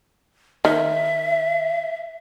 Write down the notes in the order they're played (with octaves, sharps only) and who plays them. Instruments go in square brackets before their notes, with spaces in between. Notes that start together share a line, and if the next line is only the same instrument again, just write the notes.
[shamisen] D#3 [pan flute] E5